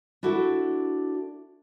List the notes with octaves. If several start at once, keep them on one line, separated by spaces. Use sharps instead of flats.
D4 E4 F#4 A4